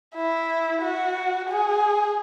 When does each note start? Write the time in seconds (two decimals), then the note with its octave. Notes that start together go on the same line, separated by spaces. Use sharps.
0.15 E4
0.82 F#4
1.49 G#4